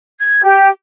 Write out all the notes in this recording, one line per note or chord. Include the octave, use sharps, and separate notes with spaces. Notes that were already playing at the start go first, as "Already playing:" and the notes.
G#6
G4